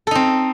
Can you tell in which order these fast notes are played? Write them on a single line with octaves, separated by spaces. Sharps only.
A4 D#4 C4